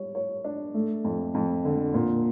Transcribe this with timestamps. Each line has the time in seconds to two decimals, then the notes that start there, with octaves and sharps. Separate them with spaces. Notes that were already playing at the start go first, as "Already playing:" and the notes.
Already playing: G3 C#5
0.15 C#5
0.44 D4
0.74 A3
1.04 F2
1.34 F2
1.65 D3
1.94 A#2